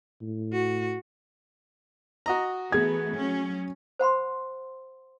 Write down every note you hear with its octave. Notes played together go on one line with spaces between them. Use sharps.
A2
F#4
F#4 D#5 A#5
E3 A3 B3 G#4 G#6
F#3 C#4
C5 F#5 B5 C6